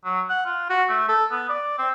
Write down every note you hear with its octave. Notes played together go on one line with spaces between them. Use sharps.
F#3
F#5
F4
F#4
A3
A4
B3
D5
C4